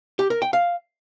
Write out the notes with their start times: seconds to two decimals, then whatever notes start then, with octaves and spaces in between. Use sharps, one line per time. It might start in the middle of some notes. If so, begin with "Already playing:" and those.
0.19 G4
0.30 A#4
0.42 G5
0.53 F5